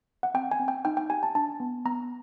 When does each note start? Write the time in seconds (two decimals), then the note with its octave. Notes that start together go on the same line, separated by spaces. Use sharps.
0.23 F#5
0.34 C4 G5
0.51 G#5
0.60 C4
0.68 G5
0.85 D#4 G5
0.97 G5
1.10 G4 G#5
1.23 A5
1.35 D4 A5
1.60 B3
1.85 B3 A#5